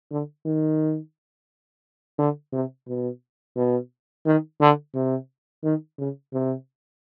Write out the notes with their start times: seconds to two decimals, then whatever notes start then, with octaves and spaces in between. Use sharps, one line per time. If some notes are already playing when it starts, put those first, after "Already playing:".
0.11 D3
0.46 D#3
2.18 D3
2.53 C3
2.87 B2
3.56 B2
4.25 D#3
4.60 D3
4.95 C3
5.64 D#3
5.98 C#3
6.33 C3